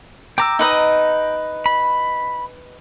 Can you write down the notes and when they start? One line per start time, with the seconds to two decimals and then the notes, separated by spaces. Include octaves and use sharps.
0.38 G5 A#5 D6 E6
0.59 D#4 B4 D#5
1.66 B5